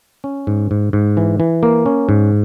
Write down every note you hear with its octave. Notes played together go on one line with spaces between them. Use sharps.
C#4
G#2
G#2
G#2
E3
E3
A#3
C#4
G#2